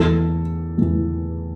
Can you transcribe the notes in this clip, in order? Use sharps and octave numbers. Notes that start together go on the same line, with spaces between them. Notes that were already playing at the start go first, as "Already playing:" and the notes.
Already playing: E2 E3 A4
E2 E3